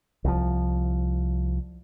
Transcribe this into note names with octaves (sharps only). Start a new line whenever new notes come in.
C2 F3